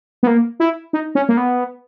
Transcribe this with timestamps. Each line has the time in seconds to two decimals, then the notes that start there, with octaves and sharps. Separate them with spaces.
0.23 B3
0.27 A#3
0.60 E4
0.93 D#4
1.15 C#4
1.29 A#3
1.37 B3